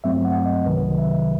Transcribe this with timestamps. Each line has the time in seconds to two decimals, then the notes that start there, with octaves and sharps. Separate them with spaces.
0.04 G2 F#3 A3 C4 E5
0.25 F#5
0.46 D#5
0.66 C2 C3 D#3 F#3 B4
0.98 E5